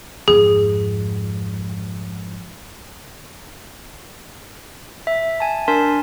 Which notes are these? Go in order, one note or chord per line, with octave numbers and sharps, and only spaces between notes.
F2 G#2 G#4
E5
G#5 A5
D4 A#4 G#5 A5 C6 B6